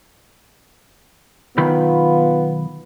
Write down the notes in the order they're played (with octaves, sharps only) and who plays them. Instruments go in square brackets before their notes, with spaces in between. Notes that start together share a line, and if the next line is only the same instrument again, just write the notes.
[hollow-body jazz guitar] B1 D#3 B5 [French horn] B3 [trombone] F4